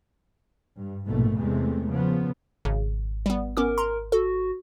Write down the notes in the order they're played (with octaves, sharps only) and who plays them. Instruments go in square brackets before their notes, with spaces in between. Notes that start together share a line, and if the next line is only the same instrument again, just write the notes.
[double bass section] G2
A#1 G#2 B2 A3
E2 C3 G#3 A3
C#3 F3 B3
[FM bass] G#1 [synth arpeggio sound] C#3
[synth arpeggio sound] G3 B3
[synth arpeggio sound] B3 C#4 D6 [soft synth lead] A#4
[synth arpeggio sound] A#5 C6
[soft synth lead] F#4 [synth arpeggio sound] A4